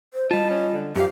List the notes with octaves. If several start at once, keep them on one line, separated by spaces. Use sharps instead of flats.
C5
G3 F4 D#5 A5
C#4
D3
F#2 F3 G4 F5